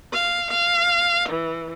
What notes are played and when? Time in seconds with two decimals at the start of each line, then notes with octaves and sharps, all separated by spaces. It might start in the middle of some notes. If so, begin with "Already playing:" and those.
0.13 F5
0.52 F5
1.30 E3